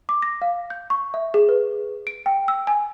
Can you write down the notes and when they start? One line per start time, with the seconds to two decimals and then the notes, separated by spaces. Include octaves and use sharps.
0.09 D6
0.22 A#6
0.42 F5
0.70 G6
0.90 C#6
1.14 E5
1.34 G#4
1.49 B4
2.07 D7
2.26 G5
2.48 E6
2.67 G#5